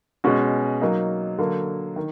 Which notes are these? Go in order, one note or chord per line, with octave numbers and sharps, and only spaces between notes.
B2 G#3 C#4 F#4
F#3 A#3 D#4
D3 F#3 A#3
D#3